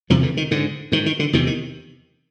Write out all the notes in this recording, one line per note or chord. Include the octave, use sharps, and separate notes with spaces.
E2 C3 D#3 F3
D3 E3
D#3
G#2 D3
G#2 D#3
D#3
D3
E2 C3 D#3
D#3